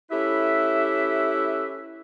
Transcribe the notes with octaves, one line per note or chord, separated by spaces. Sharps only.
A3 C#4 E4 G4 B4 E5